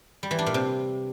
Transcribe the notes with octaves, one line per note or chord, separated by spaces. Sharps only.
G3
E3
D4
A#2
C3